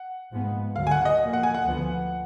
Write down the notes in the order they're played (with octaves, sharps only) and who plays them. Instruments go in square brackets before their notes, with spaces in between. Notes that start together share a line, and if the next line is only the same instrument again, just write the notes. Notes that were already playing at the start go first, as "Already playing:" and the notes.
Already playing: [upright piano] F#5
[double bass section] G#2 F3 G#3 B3
[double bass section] D2 D3 F#3 [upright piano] F5
[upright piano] G#5
F#5
D#5
[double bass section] A#2 F3 A#3
[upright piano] F#5
G#5
F#5
[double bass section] D2 D3 F3 B3